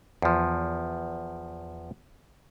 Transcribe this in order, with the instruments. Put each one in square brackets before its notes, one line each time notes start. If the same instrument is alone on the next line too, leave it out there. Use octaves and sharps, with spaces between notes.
[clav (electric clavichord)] E2 F3